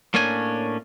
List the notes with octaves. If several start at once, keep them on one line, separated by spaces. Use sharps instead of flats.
A2 A#3 C#4 D4 G#5